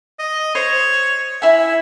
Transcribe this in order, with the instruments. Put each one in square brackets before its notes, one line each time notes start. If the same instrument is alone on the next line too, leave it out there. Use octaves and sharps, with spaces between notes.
[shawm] D#5
[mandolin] C5 [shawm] C#5
[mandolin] E4 G#5 [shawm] E5